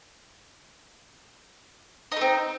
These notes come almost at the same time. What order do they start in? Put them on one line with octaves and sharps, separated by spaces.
D#4 A3 C4